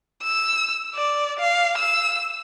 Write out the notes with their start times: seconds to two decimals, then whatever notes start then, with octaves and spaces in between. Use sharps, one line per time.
0.23 E6
0.95 D5
1.40 F5
1.78 E6